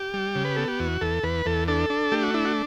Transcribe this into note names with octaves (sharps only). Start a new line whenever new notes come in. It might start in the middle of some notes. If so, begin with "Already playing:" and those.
Already playing: G4
G3
C#3
B4
B3 A4
G4
E2 F#4
E2 A4
E2 B4
E2 A4
D4 A4
D4
A3 G4
F#4
D4 E4
F#4